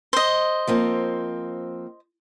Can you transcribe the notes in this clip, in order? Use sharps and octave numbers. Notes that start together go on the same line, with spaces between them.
C5 D#5
F3 A#3 C4